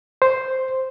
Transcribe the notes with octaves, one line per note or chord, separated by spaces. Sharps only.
C5